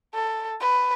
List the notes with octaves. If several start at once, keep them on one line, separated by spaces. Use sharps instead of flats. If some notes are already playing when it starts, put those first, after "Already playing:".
A4
B4